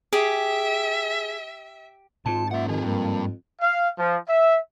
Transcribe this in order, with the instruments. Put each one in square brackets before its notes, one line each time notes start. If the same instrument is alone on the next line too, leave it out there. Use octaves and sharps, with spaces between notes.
[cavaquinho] G4 [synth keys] G#4 [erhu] E5
[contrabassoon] G#1 [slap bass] G#2 [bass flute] F4 [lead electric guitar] A5
[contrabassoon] A#2 [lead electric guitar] C#4 F#5 [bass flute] E5
[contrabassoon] F2 [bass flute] D#3 [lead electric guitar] G4 G#4
[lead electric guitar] G2 [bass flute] A#3
[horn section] F5
F3
E5